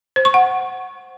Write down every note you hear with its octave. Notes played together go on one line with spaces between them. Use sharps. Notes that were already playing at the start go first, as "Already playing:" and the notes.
C5
C#6
F#5